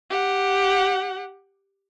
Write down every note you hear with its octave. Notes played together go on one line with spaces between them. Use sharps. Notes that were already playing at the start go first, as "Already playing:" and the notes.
G4 F#5